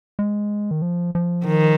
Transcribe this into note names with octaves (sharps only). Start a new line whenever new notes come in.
G#3
D#3
F3
F3
D#3